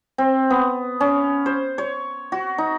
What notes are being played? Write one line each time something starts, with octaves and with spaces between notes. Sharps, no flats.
C4
B3
C#4
C5
C#5
F#4
D#4